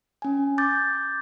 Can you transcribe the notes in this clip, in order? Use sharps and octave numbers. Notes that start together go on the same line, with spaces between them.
C#4 G#5
D6 G6 A6